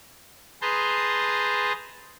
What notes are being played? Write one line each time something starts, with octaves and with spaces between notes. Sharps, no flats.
G#4 B4 A5 A#5 C6 G6